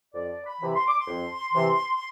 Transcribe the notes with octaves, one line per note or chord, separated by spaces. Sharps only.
F2 D5
B5
C3 E3
C6
D6
C6
F2
C3 E3